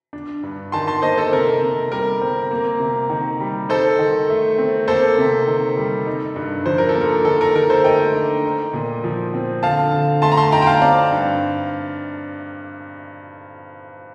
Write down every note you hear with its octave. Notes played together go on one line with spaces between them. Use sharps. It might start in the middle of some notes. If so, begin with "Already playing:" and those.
D4
G2
D#3 A5 C6
A5 C6
A#3 C5 D#5
A4 C5
C3 A#4
C3
G3 A#4
C4
A#3
C3
D#3
G3
D#4 A4 C5
D#3
A3
C4
A#3 A4 C5
C3
D#3
G3
D#4
G2
F3 C5
A#4
A4
A#3
A#4
D#3 A4
A#4
D#3 A#4
A4 C5
A3 D#5 G5
D4
D#4
A#2
F3
C4
D3 F5 A5
D3
A3 A5 C6
A#5
A5 C6
D#4 G5 A#5
G5
F5 A5
C4 D5 F5
G2